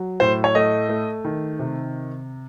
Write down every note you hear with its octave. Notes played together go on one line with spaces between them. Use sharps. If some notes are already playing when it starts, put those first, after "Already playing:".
Already playing: F#3
A2 C5
C#5
A3 D#5
A3
D#3
C3